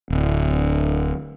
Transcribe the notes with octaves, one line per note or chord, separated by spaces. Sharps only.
D1